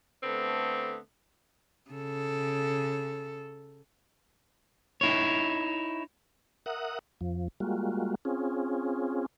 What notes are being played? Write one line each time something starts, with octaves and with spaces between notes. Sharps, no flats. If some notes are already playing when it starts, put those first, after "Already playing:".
D3 A3 B3 C4
C#3 A4
D#4 E4 C#5
A#4 E5 F#5 D#6 F#6
F2 F3
G3 G#3 A#3 F4 F#4
C4 C#4 F4 G#4